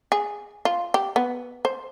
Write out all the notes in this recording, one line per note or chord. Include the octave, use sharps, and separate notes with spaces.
G#4
F4
G4
B3
C5